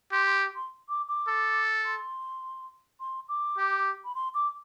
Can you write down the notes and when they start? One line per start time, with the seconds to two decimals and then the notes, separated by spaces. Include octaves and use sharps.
0.12 G4 C6
0.27 C6
0.56 C6
0.89 D6
1.08 D6
1.28 A4
1.85 C6
3.00 C6
3.29 D6
3.57 G4
4.05 B5
4.15 C6
4.34 D6